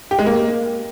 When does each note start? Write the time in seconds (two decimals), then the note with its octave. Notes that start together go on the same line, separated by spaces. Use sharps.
0.11 G4
0.19 G#3
0.26 A#3